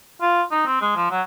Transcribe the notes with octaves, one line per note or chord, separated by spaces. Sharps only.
F4
D#4
C4
G#3
F3
F#3